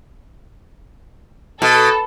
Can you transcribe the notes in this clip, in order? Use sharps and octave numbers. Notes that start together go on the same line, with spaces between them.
B2 A4